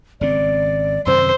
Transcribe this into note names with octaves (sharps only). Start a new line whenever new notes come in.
G#1 C#3 C4 D5
F#2 C3 D#3 C5 E6